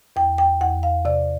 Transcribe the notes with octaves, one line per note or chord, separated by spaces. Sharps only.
E2 G5
G5
E2 F#5
F5
C3 D5